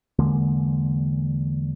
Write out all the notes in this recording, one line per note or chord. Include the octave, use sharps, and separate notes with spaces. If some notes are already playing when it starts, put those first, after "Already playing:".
E2 D3 G#3 A#3